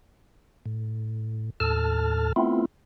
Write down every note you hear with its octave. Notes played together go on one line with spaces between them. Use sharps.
A2
D#2 A2 A4 A5 F6
A3 B3 C4 E4 F4